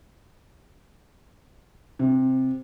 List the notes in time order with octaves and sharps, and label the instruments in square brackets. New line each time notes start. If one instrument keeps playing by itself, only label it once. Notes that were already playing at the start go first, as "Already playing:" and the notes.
[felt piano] C3